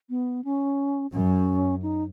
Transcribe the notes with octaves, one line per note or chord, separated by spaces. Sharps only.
B3
C#4
F#2 C#4
D#4